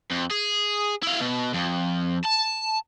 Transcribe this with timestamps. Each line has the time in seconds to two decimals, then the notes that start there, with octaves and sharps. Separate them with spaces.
0.11 F2
0.31 G#4
1.03 E4 F5
1.21 B2
1.55 F2
2.25 A5